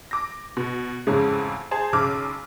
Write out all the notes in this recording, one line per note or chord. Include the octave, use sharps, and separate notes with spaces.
D6 A#6
B2
A1 F2 G#2 C#3
G#4 C5 A5
B1 C#3 D6 F6